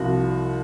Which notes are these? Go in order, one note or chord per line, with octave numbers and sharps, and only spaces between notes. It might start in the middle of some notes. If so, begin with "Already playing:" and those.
Already playing: C2 F3 F#4